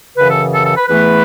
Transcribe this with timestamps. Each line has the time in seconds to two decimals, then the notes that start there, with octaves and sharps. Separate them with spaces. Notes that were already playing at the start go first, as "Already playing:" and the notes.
0.17 F#2 C#3 E3 B4
0.29 A4
0.53 A4
0.65 A4
0.76 B4
0.88 E2 E3 A3 B4